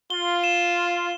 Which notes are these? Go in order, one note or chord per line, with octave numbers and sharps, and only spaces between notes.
F4 G7
E7